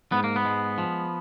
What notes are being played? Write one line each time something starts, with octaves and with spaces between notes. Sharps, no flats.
G#2 B3
A#3
B3
G#3
F3